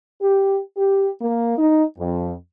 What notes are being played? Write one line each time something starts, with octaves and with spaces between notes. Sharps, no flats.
G4
G4
A#3
D#4
F2